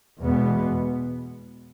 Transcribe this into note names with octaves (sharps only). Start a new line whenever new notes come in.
E2 B2 G#3 B3